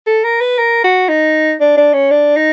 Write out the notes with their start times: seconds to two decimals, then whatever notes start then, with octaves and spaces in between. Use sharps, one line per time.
0.07 A4
0.24 A#4
0.41 B4
0.58 A#4
0.84 F#4
1.09 D#4
1.60 D4
1.77 D4
1.93 C#4
2.11 D4
2.36 D#4